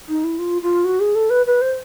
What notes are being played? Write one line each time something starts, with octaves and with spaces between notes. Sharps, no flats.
D#4
E4
F4
F4
F#4
G#4
A4
B4
B4
C5